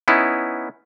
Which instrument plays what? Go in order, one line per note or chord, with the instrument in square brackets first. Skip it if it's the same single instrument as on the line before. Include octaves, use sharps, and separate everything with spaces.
[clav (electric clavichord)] B3 C#4 D#4 E4